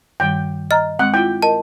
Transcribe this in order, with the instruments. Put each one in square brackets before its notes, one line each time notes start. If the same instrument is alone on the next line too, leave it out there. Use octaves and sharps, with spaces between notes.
[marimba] G2 D#3 G3 [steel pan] G5
[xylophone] D#5 [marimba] A#5 F6
[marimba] G#3 C4 [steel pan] F#5
[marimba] E4 F4 [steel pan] G5
[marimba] A#4 D#5 [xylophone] A5